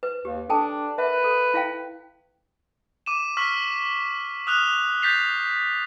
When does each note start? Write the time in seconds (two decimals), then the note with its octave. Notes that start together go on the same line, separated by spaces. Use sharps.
0.03 B4
0.25 D#2 G4
0.50 D4 A4 G5 A5
0.98 A#4 B4 E5 F#5
1.24 A4
1.54 E4 F5 G5
3.06 D6 D#7 E7
3.37 C#6 E6 F6 B6
4.47 D#6 F6 F#6 F7
5.02 G6 A6 B6 C7 F7